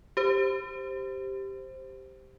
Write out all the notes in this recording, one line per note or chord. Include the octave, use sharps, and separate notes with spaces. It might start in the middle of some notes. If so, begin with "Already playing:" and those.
G4 C5